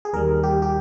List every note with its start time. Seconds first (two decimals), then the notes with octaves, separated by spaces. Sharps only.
0.05 G#4
0.13 D#2 D#3 G3 A#4
0.43 G4
0.62 G4